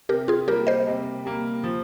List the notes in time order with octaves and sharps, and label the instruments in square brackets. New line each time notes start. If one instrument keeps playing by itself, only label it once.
[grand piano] C3 [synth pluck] G4 A#4
[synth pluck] F4 G#4
[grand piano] G3 A#3 [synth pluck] G4 A#4
[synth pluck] C5 D#5
[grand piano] C3
G3 A#3
F3